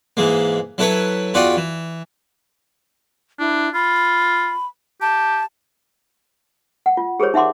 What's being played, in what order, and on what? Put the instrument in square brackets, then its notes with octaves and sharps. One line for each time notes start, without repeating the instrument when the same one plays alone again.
[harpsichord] G#2 E3 G#3 A#3
F#3 E4 A4 B4 C#5
E2 F4 F#4 D5 F#5 G5
E3
[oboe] D4 [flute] E4
[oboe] F4 [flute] B5
[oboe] G4 [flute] A5
[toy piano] F#5
F4
G4 G#4 A#4 C5 C#5
D#4 E5 F#5 C6 D6